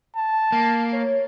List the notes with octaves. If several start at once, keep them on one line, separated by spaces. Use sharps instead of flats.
A5
A#3
C#5